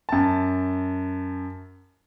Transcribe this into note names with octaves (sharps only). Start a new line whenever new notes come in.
F#2 A5